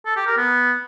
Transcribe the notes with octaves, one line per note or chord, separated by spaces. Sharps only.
A4
G4
A#4
B3